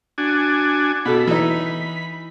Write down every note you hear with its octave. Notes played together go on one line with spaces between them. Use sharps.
D4 F#4 G#5
B2 A4 B5
E3 D#4